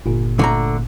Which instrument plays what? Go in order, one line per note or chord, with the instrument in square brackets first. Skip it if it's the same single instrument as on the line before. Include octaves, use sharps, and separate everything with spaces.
[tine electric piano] G1 A#2
[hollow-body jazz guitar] D3 A3 A#5